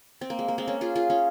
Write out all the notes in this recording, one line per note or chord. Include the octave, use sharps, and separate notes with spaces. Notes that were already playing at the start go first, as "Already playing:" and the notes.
C4
A#3
G#3
A#3
G#3 C4
A#3 C#4
F4 G#4
F4 G#4
C#4 F4